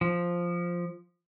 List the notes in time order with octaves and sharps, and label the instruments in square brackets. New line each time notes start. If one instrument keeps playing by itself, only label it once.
[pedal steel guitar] F3